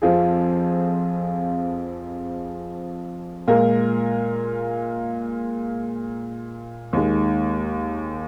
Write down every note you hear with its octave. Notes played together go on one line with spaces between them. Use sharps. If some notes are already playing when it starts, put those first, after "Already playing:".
F2 F3 C4 F4 G#4
A#2 G#3 F4 A#4
D#2 D#3 G#3